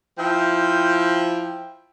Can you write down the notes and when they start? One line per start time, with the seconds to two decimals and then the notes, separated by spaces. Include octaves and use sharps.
0.19 F3 E4 G5